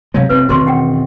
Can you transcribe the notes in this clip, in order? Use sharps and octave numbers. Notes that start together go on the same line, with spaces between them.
C3 F#3 G#3 C#5 F5
F1 C4 B4
E1 D#3 C4 F#4 C6 C#6
C#4 F#5 G5